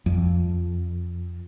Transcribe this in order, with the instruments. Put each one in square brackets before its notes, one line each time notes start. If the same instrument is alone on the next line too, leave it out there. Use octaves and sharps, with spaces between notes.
[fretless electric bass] F2